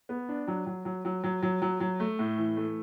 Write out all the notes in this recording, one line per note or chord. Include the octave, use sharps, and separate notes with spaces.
B3
D4
F#3
F#3
F#3
F#3
F#3
F#3
F#3
F#3
A3
A2
E3
A3